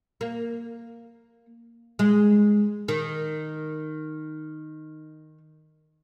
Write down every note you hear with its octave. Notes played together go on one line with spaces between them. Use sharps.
A#3
G#3
D#3